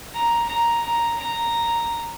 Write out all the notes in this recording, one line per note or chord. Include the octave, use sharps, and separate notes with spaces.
A#5
A#5
A#5
A#5